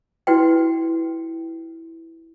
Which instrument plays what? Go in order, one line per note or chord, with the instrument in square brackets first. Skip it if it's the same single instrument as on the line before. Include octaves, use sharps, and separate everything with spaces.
[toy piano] E4 F#4 B4 G5